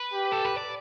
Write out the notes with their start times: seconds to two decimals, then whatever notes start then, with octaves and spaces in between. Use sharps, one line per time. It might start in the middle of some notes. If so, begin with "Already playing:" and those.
Already playing: B4
0.13 G4
0.32 A4
0.45 B4
0.58 D5